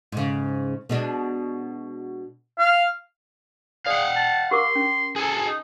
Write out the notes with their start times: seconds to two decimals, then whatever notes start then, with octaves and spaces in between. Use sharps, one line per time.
0.12 G#2 C#3
0.89 B2 G#3 D4
2.59 F5
3.86 G#4 D5 F5 F#5
4.16 A5
4.51 G4 A#4 C6 D6
4.75 C#4
5.16 G#4 A4 G#5
5.47 D#4